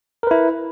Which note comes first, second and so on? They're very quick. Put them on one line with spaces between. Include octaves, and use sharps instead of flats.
A#4 B4 E4